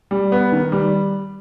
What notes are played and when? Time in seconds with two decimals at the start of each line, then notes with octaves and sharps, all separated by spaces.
0.11 G3
0.32 B3
0.52 D#3
0.72 G3